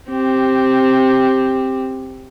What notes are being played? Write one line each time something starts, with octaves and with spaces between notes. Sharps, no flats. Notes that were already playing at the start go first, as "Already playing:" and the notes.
C4 G4